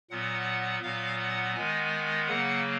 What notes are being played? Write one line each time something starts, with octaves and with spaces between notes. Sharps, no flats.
A#2 F#3 B3 F#5
A#2 F#3 B3 F5
F#5
D#3 G#3 B3 G#5
C#3 F#3 A#3 F#5